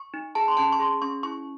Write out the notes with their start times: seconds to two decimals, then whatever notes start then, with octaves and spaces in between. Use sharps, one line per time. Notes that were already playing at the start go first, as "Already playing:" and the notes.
Already playing: C#6
0.14 D#4
0.35 G#4 A5
0.48 C6
0.57 C#4 A5
0.72 C#6
0.79 G#4 C6
1.02 C#4 C#6
1.23 E4 C#6